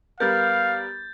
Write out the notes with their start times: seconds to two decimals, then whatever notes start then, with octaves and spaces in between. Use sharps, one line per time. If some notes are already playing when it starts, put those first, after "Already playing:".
0.20 G3 B3 A#4 F5 G6 A6